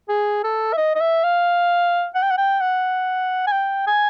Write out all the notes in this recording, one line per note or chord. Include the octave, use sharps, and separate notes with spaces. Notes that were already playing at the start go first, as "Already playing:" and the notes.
G#4
A4
E5
D#5
D#5
E5
F5
F#5
G5
F#5
G5
F#5
G#5
G5
G#5